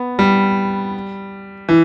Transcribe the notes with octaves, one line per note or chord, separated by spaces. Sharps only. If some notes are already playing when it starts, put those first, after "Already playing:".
Already playing: B3
G3
E3